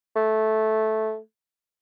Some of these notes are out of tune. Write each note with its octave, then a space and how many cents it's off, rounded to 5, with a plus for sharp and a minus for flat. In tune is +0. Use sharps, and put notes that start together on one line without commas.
A3 -10